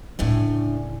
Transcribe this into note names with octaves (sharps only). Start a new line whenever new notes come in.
D1 A2 C#3 A3 D4 G#5